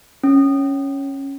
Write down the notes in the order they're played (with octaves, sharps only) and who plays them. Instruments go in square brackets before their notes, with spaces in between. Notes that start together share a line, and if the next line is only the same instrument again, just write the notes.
[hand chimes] C#4